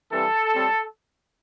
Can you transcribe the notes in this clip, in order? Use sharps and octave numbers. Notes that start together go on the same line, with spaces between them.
G2 E3 G3 C4 A4
A2 G3 C4